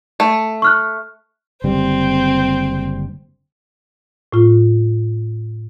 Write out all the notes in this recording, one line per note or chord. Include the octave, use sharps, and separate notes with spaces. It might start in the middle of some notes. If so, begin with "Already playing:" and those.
A3
C#6 F6 F#6
F#1 D3 G3 C4
A2 F4